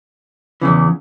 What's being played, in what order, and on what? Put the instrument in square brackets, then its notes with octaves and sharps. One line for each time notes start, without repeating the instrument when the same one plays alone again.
[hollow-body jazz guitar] E2 C#3 E3